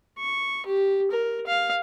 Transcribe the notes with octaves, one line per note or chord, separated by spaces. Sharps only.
C#6
G4
A#4
F5